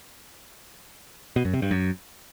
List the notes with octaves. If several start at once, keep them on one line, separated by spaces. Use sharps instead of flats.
B2
F#2
C3
G2
F#2